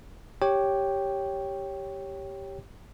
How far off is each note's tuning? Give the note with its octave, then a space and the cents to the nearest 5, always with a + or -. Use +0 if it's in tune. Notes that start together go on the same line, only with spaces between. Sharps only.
G4 +0 C#5 +0 G5 +0